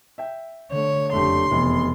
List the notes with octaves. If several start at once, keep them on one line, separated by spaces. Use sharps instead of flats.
E5 G5
D3 A3 C#5
F#1 F2 A3 D4 G4 C6
F1 E2 C3